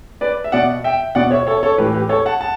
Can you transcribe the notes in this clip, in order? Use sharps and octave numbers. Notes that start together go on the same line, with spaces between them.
B4 D5
E5
B2 D5 F#5
E5 G5
B2 D5 F#5
C#5 E5
A4 C#5
A4 C#5
A2 E3 G4 B4
G4 B4
A4 C#5
F#5 A5
F#5 A5